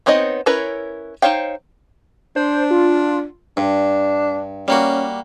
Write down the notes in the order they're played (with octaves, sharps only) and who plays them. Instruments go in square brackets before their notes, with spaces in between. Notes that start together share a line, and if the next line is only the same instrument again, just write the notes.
[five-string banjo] B3 C4 D#4 C#5 D#5
C#4 E4 A#4 B4 C#5
D#4 C5 C#5 F5 G5
[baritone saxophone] D4 [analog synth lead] C5
[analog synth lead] F4
[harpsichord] G2 [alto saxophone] D4
[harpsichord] G3 A#3 F#4 [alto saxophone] C#4